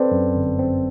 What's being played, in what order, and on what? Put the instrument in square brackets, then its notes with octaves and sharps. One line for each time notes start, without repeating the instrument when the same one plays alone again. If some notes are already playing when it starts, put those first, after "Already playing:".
Already playing: [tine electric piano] C4 [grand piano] A4 B4 C5 D5
[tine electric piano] F#2
G1
C4